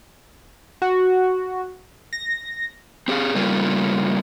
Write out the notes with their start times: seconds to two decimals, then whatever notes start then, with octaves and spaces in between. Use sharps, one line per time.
0.82 F#4
2.13 A#6
3.08 C4 G4 G#4 F5
3.35 C#3 G3 A3 A#3 C#4 F4